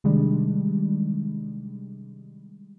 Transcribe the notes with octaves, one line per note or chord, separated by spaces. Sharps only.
C3 D#3 G3 G#3 D4